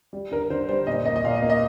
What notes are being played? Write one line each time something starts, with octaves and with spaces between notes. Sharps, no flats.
G3
D3 A#4
D3 C5
G3 C5
A#2 D#5
A#3 D#5
D#5
A#2 F5
D#5
A#3
D#5